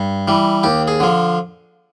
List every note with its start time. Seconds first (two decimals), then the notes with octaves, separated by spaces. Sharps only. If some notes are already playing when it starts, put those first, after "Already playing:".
Already playing: G2
0.28 E3 G3
0.63 D#2 G4
0.88 G#4
1.00 D3 F3